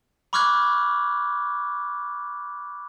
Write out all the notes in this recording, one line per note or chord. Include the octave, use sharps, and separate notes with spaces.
B5 C#6 D6 F6 F#6 G#6